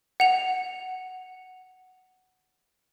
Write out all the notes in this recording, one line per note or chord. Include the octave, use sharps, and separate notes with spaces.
F#5 F7